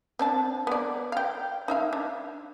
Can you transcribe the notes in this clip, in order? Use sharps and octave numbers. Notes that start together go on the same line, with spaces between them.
C4 D4 A5
B3 D5
F5 G5
D#4 E5 F5
D4